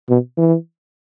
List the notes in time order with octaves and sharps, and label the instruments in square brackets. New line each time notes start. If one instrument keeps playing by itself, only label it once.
[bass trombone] B2
E3